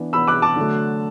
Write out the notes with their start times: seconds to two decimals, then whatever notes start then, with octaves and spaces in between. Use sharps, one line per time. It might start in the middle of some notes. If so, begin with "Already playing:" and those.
Already playing: E3 B3 D4
0.13 E3 B3 D4 B5 E6
0.27 D6 F#6
0.42 A5 D6
0.56 D3 F#3 A3